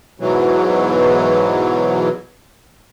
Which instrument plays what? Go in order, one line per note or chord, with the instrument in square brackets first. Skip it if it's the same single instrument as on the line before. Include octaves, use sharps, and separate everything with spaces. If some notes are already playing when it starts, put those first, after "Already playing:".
[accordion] G#2 B2 E3 F#3